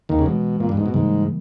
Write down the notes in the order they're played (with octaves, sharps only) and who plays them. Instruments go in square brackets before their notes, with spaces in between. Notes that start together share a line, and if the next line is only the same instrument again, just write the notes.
[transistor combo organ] D#2 D#3
C#3
[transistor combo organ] B2 [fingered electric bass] E3 G#3 B3
[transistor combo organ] A#2
G2
G#2
B2
[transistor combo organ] G#2 [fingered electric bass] C#3 E3 G3 A#3